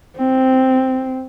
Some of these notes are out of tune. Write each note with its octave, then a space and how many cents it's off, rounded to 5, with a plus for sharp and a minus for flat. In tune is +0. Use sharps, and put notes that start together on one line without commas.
C4 -5